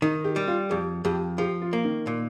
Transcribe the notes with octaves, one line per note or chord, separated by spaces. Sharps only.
D#3 D#4
G4
G3
F4
F2 G4
F2 G4
F3 G4
F4
A#3
D#3
A#2